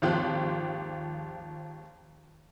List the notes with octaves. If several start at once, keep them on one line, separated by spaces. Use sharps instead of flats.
G#1 D#2 F3 G4 C6 F#6